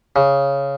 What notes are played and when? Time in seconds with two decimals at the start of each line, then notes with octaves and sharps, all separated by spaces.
0.16 C#3